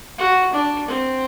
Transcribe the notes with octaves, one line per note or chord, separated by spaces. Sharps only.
F#4
D4
C4